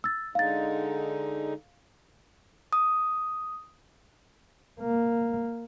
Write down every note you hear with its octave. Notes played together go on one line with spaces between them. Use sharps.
E6 A6
D3 G#3 D#4 F5 A6
D#6
A#3